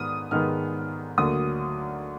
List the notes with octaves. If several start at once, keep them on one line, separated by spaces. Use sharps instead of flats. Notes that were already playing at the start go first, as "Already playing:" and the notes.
Already playing: G#2 D#3 B3 D#6 F6
G#2 D#3 G#3 B3 F6
D2 D3 F#3 A#3 D#6